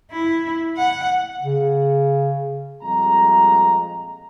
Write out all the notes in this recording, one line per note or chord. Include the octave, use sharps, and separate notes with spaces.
E4
F#5
C#3
F2 A#2 G3 G#3 A#5